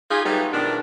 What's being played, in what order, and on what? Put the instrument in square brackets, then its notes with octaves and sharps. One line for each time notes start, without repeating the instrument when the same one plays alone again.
[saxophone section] D#4 F4 G4 G#4
F#3 G3 A3 B3 D#4 B4
B2 D#3 F3 D4